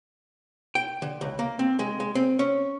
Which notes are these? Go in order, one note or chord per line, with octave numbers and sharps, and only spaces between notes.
G5
D3
C#2
A#3
C4
G#3
G#3
C4
C#4